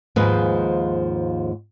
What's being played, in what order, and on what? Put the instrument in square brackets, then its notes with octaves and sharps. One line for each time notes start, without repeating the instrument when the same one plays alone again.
[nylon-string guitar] D#2 G#2 F3 G#3 G#4 B4